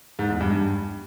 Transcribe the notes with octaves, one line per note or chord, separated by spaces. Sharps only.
G#2
E2
G2
G2